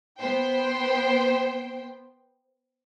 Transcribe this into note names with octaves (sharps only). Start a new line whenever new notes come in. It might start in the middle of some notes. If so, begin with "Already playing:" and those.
B3 C5 G5